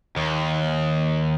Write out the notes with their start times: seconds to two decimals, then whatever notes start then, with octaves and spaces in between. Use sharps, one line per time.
0.17 D#2